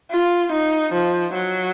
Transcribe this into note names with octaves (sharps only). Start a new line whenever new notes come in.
F4
D#4
F3
F#3